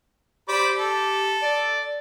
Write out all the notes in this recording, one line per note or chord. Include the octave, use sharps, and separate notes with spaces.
G4 C5 D5 B5
A4
D5